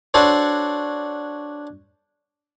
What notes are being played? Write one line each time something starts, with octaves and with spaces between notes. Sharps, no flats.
D4 F#4 A4 C5 C#5